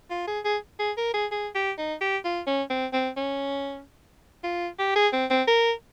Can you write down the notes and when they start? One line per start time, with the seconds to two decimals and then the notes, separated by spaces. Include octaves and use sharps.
0.10 F4
0.27 G#4
0.45 G#4
0.79 G#4
0.97 A#4
1.14 G#4
1.31 G#4
1.55 G4
1.78 D#4
2.01 G4
2.24 F4
2.47 C#4
2.70 C4
2.93 C4
3.17 C#4
4.43 F4
4.78 G4
4.95 G#4
5.13 C4
5.30 C4
5.47 A#4